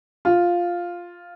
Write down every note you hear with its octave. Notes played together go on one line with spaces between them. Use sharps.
F4